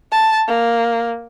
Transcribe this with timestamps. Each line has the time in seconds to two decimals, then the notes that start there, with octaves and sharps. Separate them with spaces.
0.12 A5
0.48 A#3